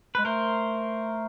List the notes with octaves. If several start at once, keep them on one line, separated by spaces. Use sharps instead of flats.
G#3 B4
A3 A#4 C5